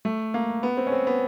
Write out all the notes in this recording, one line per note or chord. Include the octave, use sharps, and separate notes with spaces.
A3
A#3
B3
C4
C#4
C4
B3